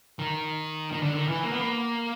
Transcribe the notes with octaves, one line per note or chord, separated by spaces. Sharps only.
D#3
D#3
D3
D#3
E3
A#3
B3
A#3